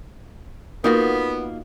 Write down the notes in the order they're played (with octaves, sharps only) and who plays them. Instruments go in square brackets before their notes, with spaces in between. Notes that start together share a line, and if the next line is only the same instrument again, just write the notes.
[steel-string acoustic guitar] A#3 [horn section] B3 [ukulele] D#4 F4 F#4